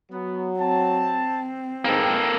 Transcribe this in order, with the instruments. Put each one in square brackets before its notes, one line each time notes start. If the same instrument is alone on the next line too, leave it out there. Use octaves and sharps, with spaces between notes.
[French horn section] F#3 [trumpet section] B3
[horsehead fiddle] C4 [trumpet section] A5
[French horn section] G#2 [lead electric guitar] A#3 A4 [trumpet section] B4 D#5 G5